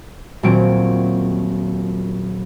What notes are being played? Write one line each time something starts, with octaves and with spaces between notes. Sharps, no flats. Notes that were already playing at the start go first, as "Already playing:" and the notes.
D#1 A#2 F#3 C4 D7